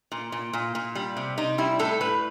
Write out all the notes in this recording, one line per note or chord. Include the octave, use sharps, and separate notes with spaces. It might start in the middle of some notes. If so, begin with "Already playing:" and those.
A#2
A#2
A#2
A#2
G3
C3
C3 D#4
G3 E4
A2 A4
A2 B4